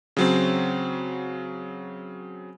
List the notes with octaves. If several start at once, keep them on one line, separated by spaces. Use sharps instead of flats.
C#3 F#3 C4